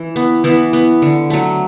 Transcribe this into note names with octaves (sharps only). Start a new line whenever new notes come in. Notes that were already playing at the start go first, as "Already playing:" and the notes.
Already playing: E3
B3
E3 B3
B3
D3
F#3 A3